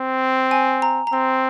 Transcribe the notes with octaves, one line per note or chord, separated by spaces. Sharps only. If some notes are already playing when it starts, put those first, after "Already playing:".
Already playing: C4
G#5
A#5
A#5
C4 C6